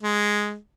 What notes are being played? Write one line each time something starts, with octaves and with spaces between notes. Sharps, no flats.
G#3